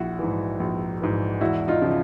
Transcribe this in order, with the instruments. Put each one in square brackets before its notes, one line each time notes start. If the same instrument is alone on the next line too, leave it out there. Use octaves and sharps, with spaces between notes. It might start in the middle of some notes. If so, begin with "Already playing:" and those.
Already playing: [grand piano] A#1 E4 F#4
G#2 E3
A#1
G#2 E3
E1 E4 F#4
D#4 F4
C#3 F3